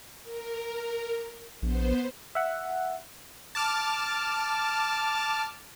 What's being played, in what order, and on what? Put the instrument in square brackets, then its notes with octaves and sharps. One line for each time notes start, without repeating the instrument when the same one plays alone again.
[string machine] A#4
[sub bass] A#1 [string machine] B3 C5
[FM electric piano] E5 F#5
[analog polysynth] A5 D6 F6